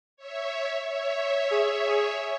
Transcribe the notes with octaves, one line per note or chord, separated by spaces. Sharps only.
C#5 E5
C#5 E5
G#4
G#4